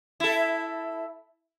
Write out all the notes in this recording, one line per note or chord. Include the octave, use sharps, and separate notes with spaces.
E4 A4